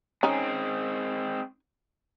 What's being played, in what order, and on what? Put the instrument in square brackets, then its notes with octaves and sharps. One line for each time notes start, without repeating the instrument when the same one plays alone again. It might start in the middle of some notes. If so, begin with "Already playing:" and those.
[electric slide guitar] G#3 C4 [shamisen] C#4 D#4 G#5